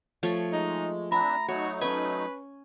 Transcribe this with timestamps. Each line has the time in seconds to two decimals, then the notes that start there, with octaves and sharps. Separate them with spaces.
0.23 F3 A3 C#5
0.52 G#3 D#4
1.12 C4 D4 E5 A#5 B5
1.48 F#3 A3 D#4 F#4 C#5
1.81 C#4 B4 G#5